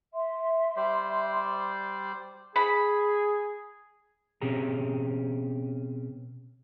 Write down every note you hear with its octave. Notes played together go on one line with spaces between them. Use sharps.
E5 C6
G3 C5 D5
G#4 B5
B2 C4 C#4 G4 G#4 A#5